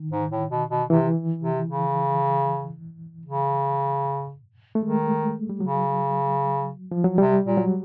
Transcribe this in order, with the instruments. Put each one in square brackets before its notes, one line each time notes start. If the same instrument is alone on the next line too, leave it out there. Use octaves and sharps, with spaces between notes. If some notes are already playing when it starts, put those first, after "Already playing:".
Already playing: [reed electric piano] D#3
[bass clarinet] G#2
A2
B2
B2
[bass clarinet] C3 [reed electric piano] E3
[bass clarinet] C3
C#3
C#3
[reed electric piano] A3
[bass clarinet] D#3 [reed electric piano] G#3
[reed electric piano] G3
[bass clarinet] C#3 [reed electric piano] F#3
[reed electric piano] F3
F#3
[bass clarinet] C3 [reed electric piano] G3
[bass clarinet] A#2
[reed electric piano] F#3